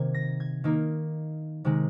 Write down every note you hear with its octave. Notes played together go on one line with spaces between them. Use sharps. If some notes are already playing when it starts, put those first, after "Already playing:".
Already playing: C3 D#3 A#3 G#6
A#6
G#6
D#3 A#3 D#4
C3 D#3 G#3